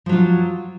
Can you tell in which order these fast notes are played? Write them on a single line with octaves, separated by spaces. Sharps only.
F3 F#3 F4